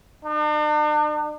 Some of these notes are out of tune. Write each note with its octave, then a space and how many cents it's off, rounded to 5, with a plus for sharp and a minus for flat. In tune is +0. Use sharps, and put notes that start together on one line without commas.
D4 +45